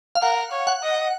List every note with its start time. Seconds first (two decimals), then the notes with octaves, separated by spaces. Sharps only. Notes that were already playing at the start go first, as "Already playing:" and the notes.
0.15 F5
0.22 A#4 F#5
0.51 C#5
0.67 F#5
0.82 D#5